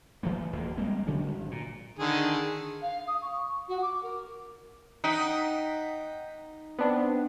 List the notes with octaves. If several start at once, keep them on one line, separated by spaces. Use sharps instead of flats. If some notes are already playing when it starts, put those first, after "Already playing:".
E3 F3 A3 A#3
F#1 E2 A#3
G3 G#3 A#3 C4
C#3 F#3 G3 C#4
G#1
A#2
D3 D#3 G#4
F5
D#6
C#6
F#4
D6
A#4
D#4 F#5 G5 B6
B3 C4 D4